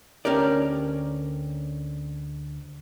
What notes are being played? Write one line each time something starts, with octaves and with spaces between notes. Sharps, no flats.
D2 C#4 G4 A#4 D5